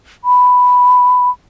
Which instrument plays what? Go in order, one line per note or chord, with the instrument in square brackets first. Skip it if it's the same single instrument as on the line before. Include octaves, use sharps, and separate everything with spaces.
[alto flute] B5